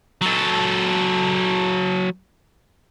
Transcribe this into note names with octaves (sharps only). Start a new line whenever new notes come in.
F#3 A4